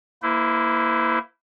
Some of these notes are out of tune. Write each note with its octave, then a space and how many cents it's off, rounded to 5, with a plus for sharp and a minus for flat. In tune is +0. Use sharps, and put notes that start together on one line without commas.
A#3 +0 E4 +0 C5 -45